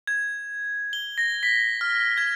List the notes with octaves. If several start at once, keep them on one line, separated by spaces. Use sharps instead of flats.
G#6
G7
A#6
B6
F6
G#6